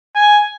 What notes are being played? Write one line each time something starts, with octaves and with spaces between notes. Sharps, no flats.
G#5